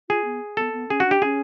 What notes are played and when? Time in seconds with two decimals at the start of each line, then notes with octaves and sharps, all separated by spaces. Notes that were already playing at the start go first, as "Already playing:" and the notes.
0.09 F4 G#4
0.25 B3
0.57 B3 A4
0.73 B3
0.89 C#4 G#4
1.00 F#4
1.06 D4
1.11 G4
1.22 C#4 G#4